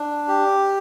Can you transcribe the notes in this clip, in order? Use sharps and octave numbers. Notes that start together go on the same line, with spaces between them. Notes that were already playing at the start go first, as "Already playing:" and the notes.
Already playing: D4
G4